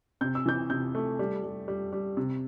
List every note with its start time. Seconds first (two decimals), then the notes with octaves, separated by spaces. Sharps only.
0.21 C3 G6
0.35 E6
0.46 E3 G6
0.70 C3 G6
0.95 A3
1.19 G3
1.44 G3
1.68 G3
1.93 G3
2.17 C3